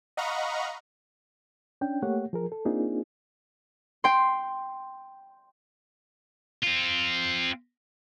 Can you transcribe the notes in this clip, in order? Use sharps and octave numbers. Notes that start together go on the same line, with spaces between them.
D#5 F5 F#5 A#5 B5 C#6
C#4 D4 G5
A3 A#3 G4 C#5 F#5
F3 G#4 A#4
A4
A#3 C4 D4 D#4 F4 G#4
G5 C6
C4 F4